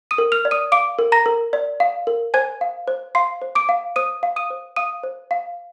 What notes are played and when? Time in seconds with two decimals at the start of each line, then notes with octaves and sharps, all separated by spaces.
0.11 D#6 D#7
0.18 A#4
0.32 F6 F7
0.45 D5
0.51 D#6 D#7
0.72 F5 D6 D7
0.99 A#4
1.12 A#5 A#6
1.26 A#4
1.53 D5
1.80 F5
2.07 A#4
2.34 C5 G#5 G#6
2.61 F5
2.88 C5
3.15 F5 C6 C7
3.42 C5
3.55 D6 D7
3.69 F5
3.96 C5 D#6 D#7
4.23 F5
4.36 D#6 D#7
4.50 C5
4.76 F5 D#6 D#7
5.03 C5
5.31 F5